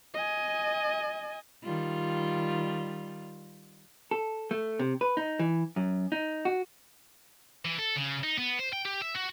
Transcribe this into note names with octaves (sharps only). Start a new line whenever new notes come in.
D#5 G#5
D#3 G3 F4
A4
A3
C3
B4
D#4
E3
F#2
D#4
F#4
E3
A4
C#3
D#4
B3
C5
G5
G4
E5
F#4